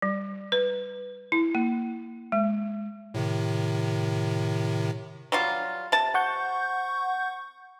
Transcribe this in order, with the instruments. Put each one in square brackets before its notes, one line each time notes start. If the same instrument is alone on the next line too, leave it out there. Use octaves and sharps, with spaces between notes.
[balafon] G3
B4
E4
A#3
G#3
[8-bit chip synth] A2 C3 D#3
[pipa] F#3 G3 F4
C3 A5
[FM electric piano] F#5 C#6 G6